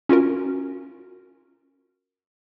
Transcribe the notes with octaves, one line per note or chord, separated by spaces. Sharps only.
C#4 F4 F#4 A#4